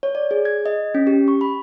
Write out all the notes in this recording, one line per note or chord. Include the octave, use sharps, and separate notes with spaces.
C#5
D5
G#4
G#6
D#5
C#4
G4
C#6
B5